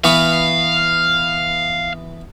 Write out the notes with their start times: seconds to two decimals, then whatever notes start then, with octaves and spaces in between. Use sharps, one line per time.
0.04 E3 B3 F5 C#6